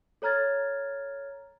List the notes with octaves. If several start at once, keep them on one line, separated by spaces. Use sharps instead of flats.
A4 C#5 A#5 F6 G#6 A6